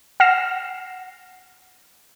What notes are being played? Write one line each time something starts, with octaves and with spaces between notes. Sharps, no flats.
F#5 F6 A#6 C7 E7